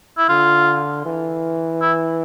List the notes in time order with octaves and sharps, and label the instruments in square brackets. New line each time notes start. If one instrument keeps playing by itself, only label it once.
[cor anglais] E4
[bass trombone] D3 [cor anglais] F4
[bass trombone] E3
[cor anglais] E4